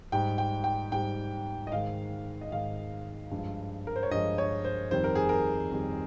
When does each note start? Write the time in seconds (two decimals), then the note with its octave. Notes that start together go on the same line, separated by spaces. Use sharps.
0.12 G#2 G3 G5
0.38 G5
0.64 G5
0.92 G#2 G3 G5
1.67 D#5
1.72 G#2 D#3 G#3 F5
2.41 D#5
2.52 G#2 D#3 G#3 F5
3.31 G2 F3 G#3
3.87 A#4
3.96 C5
4.03 C#5
4.11 G2 F3 G#3 D#5
4.38 C#5
4.65 C5
4.91 F2 D#3 G3 C5
5.04 A#4
5.15 G#4
5.29 A#4
5.71 F2 D#3 G3